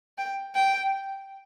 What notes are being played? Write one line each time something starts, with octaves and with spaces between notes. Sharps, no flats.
G5
G5